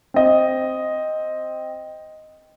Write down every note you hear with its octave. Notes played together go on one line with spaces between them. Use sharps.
C4 D#5